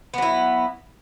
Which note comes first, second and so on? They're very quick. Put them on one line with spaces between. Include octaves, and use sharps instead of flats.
B3 F#3 E4